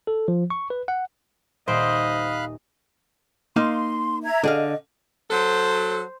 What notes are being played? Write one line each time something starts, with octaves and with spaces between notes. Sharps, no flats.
A4
F3
C#6
B4
F#5
D#1 C5 D#5 F5 B5 F#6 D7
A#3 D#4 F5 C6
E5 A#5 G#6
D3 G#4 D#5 F5
F#3 A4 C5